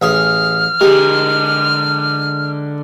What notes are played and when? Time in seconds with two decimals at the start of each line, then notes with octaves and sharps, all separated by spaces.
0.02 A1 G#4 F6
0.81 D3 G#3 G4 A#4